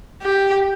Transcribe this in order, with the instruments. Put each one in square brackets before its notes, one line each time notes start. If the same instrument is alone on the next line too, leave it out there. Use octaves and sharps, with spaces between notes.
[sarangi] G4